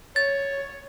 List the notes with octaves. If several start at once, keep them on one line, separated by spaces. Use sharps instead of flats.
C#5 A6